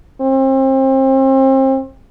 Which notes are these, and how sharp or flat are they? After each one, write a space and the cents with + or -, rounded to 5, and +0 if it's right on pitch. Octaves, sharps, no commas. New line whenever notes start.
C4 +35